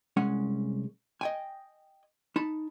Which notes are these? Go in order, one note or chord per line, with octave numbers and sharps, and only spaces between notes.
C2 G#3 C#4 F#5 G#5
D#5 G5 G#5
D#4 A5 B5